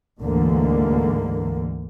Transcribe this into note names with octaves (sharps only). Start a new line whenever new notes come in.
D2 G#2 D3 E3 A#3